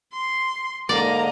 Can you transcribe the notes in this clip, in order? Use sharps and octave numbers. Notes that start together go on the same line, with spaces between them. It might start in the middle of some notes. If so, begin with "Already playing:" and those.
C6
G#2 D3 A#3 D5 D#5 A#5